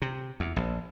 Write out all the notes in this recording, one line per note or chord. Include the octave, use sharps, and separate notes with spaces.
C3
E2
A#1